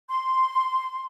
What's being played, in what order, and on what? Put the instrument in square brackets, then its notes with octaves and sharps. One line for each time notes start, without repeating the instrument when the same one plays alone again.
[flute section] C6